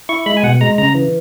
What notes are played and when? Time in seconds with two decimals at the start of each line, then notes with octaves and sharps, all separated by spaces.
0.09 E4 C#6
0.26 G#3 B5
0.37 G#5
0.43 B2 F#5
0.61 G#3 A#5
0.78 C#3 A#5
0.95 E3